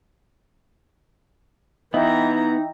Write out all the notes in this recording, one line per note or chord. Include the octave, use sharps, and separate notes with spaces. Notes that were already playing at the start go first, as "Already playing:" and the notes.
E3 B3 D#4 D#5 E5 G5 A#5